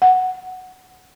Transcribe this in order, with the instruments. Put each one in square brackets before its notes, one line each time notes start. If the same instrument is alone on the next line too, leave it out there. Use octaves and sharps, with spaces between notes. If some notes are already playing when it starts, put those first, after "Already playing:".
[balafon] F#5